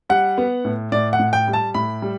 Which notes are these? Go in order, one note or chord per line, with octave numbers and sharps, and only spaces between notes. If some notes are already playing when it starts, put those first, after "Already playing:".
G3 F#5
B3
A2
A2 D5
F#5
A2
G5
G3
A5
A2 B5
G3